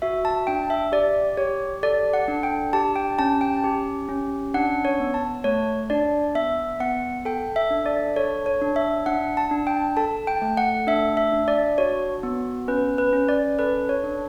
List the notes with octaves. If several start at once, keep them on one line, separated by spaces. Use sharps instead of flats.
F#4 E5
A5
D4 G5
E5
G4 D5
G4 C#5
A4 D5
F#5
D4
G5
G4 A5
G5
C#4 A5
G5
G4
C#4
D4 F#5
C#5
B3
A5
A3 C#5
D4 D5
B3 E5
B3 F#5
A4 G5
E5
D4
D5
A4 C#5
C#5
D4
E5
D4 F#5
A5
D4
G5
A4 A5
G5
A3
F#5
D4 E5
E5
D4
D5
F#4 C#5
B3
C#4 B4
B4
C#4
D5
A4 B4
C#5
D4